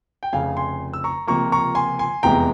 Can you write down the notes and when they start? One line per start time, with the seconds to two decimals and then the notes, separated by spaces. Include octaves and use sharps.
0.23 G5
0.33 F1 F2 C#3 F5 G#5
0.57 G#5 C6
0.93 E6
1.04 A#5 C#6
1.27 C#2 C3 F3 A#3 A#5 C#6
1.52 A#5 C#6
1.75 G#5 C6
1.99 G#5 C6
2.23 F1 E2 C3 E3 G#3 G5 A#5